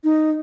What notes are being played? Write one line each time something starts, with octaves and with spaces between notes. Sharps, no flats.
D#4